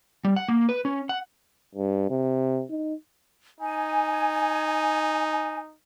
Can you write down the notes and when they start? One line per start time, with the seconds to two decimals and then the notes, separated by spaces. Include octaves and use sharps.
0.25 G3
0.36 F#5
0.48 A#3
0.69 B4
0.85 C#4
1.09 F#5
1.75 G2
2.10 C3
2.70 D#4
3.60 D#4 G#5